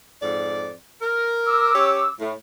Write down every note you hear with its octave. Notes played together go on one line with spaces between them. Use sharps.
F2 G#2 D5
A#4
D6 E6
C#4 G4 C#5
A2